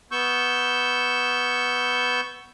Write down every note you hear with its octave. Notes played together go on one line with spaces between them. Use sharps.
B3 C#6 E6 G6